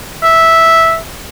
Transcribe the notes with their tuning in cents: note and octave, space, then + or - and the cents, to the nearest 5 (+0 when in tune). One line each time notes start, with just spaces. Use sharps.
E5 -5